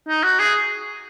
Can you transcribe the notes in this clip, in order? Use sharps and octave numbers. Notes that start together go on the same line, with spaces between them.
D#4
F#4
G#4